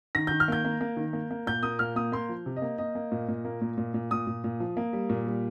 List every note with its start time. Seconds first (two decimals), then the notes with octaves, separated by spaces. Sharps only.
0.15 D#3 A#6
0.27 D#3 G6
0.40 F6
0.48 A#3 G6
0.65 A#3
0.81 A#3
0.97 D#3
1.13 A#3
1.31 A#3
1.47 A#2 G6
1.63 A#3 D#6
1.79 A#2 F6
1.96 A#3 D#6
2.12 A#3 C6
2.29 F3
2.46 C3
2.56 D#5
2.62 A#3
2.78 A#3 D#5
2.95 A#3
3.12 A#2
3.29 A#2
3.45 A#3
3.61 A#2
3.78 A#2
3.94 A#2
4.11 A#2 D#6
4.27 A#2
4.44 A#2
4.60 F3
4.77 A#3
4.93 G3
5.10 A#2
5.27 G3